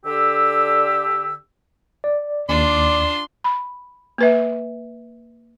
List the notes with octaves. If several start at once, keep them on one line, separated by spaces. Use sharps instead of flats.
D3 G4 E6
D5
D#2 D4 F4 D5 C6
B5
A#3 B4 E5